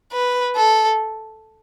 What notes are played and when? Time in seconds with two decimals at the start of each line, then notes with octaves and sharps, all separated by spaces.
0.12 B4
0.56 A4